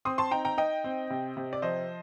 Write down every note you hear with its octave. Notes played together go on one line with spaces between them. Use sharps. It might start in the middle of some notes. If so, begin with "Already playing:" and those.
C4 C6 D#6
A5 C6
D#4 G5 A#5
G5 A#5
D#4 D#5 G5
C4
C3
C3
D5
F3 C5 D#5